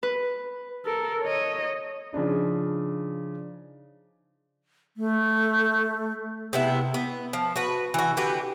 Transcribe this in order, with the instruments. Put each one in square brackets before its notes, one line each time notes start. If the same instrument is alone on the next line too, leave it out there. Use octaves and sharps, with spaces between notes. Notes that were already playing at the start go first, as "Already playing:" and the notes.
[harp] B4
[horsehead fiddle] A4 A#4
C#5 D#5
[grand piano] C#3 F3 D4 D#4
[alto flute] A3
[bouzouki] C3 B3 E4
B3
F3
F#4 B4
E3 F#4
D3 F#4 G4 B4